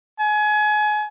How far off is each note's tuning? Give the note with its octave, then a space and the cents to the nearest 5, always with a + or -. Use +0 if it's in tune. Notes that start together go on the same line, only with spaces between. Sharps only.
G#5 +30